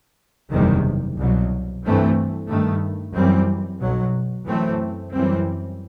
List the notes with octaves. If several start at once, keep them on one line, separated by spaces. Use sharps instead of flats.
F#1 E2 C3 D#3 G3
C2 B2 F#3
G2 E3 A3 C4
G2 D#3 A3
F#2 E3 G3 C4
B1 B2 F#3
F#2 E3 A3 C4
F#2 E3 G3 C4